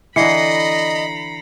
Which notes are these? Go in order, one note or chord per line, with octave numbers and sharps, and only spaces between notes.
D3 E3 D#5 A#5 B5 C7 C#7